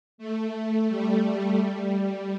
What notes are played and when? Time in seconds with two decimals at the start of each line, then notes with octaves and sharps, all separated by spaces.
0.18 A3
0.88 G3
1.58 G3